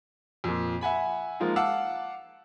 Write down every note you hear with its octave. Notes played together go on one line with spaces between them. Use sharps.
F2 A#2
E5 F#5 G#5 B5
F3 G#3 A#3 D#4 F4
F5 F#5 A5 D6 E6